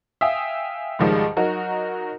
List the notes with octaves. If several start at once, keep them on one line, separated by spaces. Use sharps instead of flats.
E5 F5 G5 G#5 D#6
C#2 G#2 D#3 F3 G3 G#3
F#3 D#4 F#4 A#4